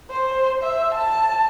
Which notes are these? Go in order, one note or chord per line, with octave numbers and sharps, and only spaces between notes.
C5
E5
A5